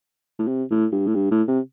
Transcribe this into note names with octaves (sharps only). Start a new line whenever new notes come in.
A2
C3
A2
G2
A2
G2
A2
C3